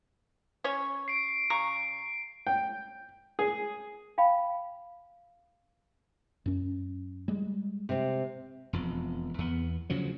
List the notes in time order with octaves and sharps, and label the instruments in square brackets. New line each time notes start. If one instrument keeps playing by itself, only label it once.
[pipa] C#4 C#5
[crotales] C7 D7
[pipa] C#3 A#5 C#6
[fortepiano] G5
G#4
[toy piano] F5 G5 B5
[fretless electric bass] F#2 C#4
G3 G#3
[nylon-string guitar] C3 C4
[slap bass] E1 F2
E2 B3
D2 C#3 F3 F#3